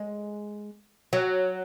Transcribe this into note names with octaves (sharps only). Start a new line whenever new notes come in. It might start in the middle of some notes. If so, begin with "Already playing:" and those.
Already playing: G#3
F#3